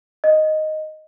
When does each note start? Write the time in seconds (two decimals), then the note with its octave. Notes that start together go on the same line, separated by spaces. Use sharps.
0.24 D#5